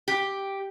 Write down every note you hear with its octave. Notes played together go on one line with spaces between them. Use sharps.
G4